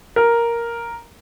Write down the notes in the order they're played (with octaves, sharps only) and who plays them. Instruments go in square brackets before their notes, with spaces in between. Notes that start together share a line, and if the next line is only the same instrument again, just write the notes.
[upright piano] A#4